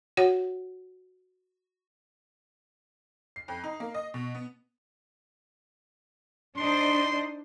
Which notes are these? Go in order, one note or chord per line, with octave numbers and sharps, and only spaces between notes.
F#4 C#5 F#5
C7
F2
D#4
A#3
D#5
B2
B3
D4 D#4 C5 C6